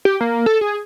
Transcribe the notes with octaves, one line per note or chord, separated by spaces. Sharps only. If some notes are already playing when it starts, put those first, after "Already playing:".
G4
A#3
A4
G#4